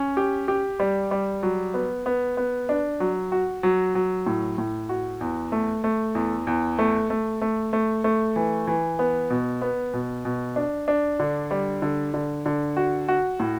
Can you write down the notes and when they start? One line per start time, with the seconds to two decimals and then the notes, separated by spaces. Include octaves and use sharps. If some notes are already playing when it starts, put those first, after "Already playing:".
Already playing: C#4
0.17 G4
0.48 G4
0.80 G3
1.11 G3
1.43 F#3
1.74 B3
2.06 B3
2.37 B3
2.69 D4
3.00 F#3
3.32 F#4
3.63 F#3
3.95 F#3
4.27 A2
4.58 A2
4.89 F#4
5.21 E2
5.52 A3
5.84 A3
6.15 E2
6.47 E2
6.79 A3
7.10 A3
7.42 A3
7.73 A3
8.04 A3
8.36 E3
8.67 E3
8.99 B3
9.30 B2
9.62 B3
9.94 B2
10.25 B2
10.56 D4
10.88 D4
11.20 D3
11.51 G3
11.82 D3
12.14 D3
12.46 D3
12.77 F#4
13.08 F#4
13.40 A2